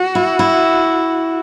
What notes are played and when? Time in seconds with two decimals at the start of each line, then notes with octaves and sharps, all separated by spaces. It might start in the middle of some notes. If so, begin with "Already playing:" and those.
Already playing: F#4
0.15 E4
0.39 E4